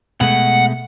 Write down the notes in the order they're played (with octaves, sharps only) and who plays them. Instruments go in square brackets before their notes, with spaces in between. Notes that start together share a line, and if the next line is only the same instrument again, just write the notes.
[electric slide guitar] B2 G#3 A3 [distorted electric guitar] F#5